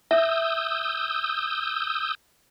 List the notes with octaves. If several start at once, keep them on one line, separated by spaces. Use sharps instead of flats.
E5 D#6 E6 G6